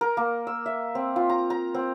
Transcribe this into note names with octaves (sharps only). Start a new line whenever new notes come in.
A#4
A#3
E6
E5
C4
F4
A#5
A#5
C4